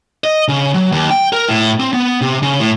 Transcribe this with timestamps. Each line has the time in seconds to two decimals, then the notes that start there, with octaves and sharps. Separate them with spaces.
0.24 D#5
0.48 C#3
0.74 F#3
0.92 D#2
1.10 G5
1.33 A#4
1.49 A2
1.80 C4
1.93 B3
2.21 C3
2.43 C#3
2.60 A2